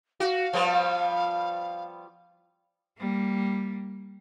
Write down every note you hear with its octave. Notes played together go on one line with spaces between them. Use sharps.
F#4 F5
F3 G3 B3
G3 A#3